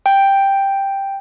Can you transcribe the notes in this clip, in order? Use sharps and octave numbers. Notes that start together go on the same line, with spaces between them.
G5